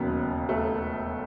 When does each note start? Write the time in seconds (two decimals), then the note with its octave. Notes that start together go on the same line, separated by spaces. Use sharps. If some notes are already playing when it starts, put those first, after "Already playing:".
Already playing: E1 D#2 C#3 F#3 B3
0.49 A3